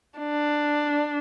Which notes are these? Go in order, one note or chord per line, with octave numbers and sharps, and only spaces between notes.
D4